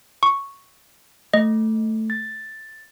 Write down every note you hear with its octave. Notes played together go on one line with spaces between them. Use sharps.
C#6
A3 D#5
A6